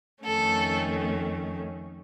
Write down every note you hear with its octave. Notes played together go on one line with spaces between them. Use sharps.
F2 D#3 A3 C#4 A4